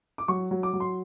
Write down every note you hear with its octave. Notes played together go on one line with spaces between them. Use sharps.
D6
F#3 C#6
F#3
D6
F#3
C6